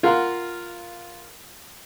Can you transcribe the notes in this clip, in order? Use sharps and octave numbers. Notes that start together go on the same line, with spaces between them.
F4 A#4 F5 F#5 C6